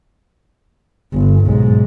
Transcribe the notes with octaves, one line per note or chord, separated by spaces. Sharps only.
G1
B1 G#2